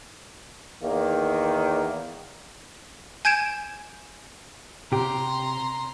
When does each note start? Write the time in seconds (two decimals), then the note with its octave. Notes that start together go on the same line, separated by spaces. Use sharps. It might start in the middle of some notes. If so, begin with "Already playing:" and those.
0.82 E2 D#3 A#3
3.25 G#5 G6 G#6 D7 E7
4.92 C3 G4 A#5 C6